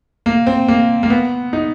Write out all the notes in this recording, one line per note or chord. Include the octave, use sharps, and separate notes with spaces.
A#3
C4
A#3
A#3
B3
D#4